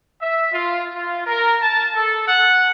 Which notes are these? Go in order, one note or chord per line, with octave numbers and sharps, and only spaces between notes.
E5
F4
F4
A#4
A5
A4
F#5